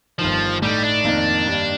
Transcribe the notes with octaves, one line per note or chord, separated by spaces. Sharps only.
G1 G2 D#3 F3
A2 G3 A3 D#4
D4
F2 D#3 A#3 D#4
G2 D#3 G3 A#3